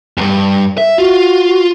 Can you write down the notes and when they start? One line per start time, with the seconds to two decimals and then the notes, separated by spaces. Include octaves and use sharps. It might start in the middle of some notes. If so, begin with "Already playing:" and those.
0.17 E2 G2
0.78 E5
0.98 F4 F#4